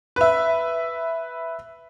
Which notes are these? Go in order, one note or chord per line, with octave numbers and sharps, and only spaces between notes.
B4 E5